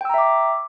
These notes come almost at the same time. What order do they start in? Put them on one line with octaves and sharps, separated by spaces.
G5 E6 A#5 E5 D6